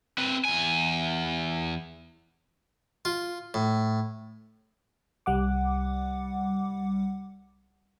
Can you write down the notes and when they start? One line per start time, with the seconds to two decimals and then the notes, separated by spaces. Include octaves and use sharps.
0.18 C4 B4
0.45 E2 G#5
3.05 F4
3.54 A2
5.26 C2 G3 F#5 D6